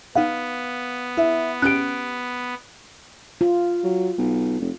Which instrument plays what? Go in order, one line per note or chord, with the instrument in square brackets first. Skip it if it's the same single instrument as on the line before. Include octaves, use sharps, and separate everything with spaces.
[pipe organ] B3 [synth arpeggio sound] D#4 F#5 [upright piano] F5
[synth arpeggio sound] E4 [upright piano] E5
[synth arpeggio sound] C#4 G4 [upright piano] F#6 D7
[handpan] F4
[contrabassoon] F#3
B1
F1